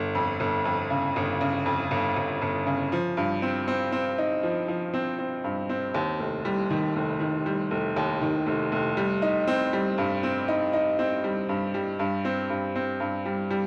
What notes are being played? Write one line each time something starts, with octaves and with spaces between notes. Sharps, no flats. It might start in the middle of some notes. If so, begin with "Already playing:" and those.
Already playing: G1
F2
G1
F2
C#3
G1
C#3
F2
G1
G1
G1
C#3
F3
G2
C4
C4
C4
D#4
F3
F3
C4
C4
G2
C4
D#2
F1
G3
D#3
F1
D#3
G3
F1
D#2
D#3
F1
F1
G3
D#4
C4
G3
G2
C4
D#4
D#4
C4
G3
G2
G3
G2
C4
G2
C4
G2
G3
G3